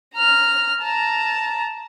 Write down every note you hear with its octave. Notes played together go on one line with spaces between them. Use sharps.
A#5 F6
A5 A#5